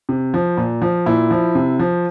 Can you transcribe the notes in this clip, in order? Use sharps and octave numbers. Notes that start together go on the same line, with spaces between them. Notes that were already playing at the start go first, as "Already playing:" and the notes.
C3
F3
A#2
F3
A#2 E4
F3
C3
F3